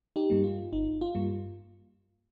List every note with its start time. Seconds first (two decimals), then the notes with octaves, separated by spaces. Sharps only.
0.16 D#4 G4
0.30 G2 G3 A#3
0.44 F4
0.73 G1 D#4
1.01 F4
1.15 G2 G3 A#3